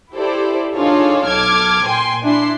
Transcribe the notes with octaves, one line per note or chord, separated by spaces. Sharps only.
E4 G4 A4 C5 D5
D4 D#4 F4 G#4 A4 C#5
B1 A4 D6 F6 G#6
A#2 G5 G#5 C6
D4 E4 C6